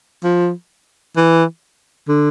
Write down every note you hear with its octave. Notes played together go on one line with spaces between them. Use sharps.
F3
E3
D3